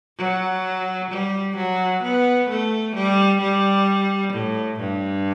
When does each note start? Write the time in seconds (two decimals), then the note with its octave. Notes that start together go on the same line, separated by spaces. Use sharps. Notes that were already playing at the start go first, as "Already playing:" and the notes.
0.18 F#3
1.10 G3
1.56 F#3
2.03 B3
2.49 A3
2.95 G3
3.41 G3
4.33 A2
4.80 G2